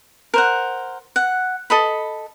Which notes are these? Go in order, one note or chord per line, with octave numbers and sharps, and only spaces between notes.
A#4 C5 F#5
F#5
A4 D#5 B5